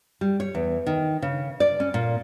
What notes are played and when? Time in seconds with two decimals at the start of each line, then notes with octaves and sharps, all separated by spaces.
0.21 G3
0.40 C#5
0.55 E2
0.87 D#3
1.22 C#3
1.60 D5
1.80 C#4
1.94 A#2